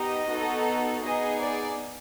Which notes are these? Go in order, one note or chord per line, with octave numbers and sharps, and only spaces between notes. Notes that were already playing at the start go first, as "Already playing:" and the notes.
Already playing: B3 D#4 G4 D#5
B3 D#4 F#4 A4
B3 D#4 G#4 D#5
D5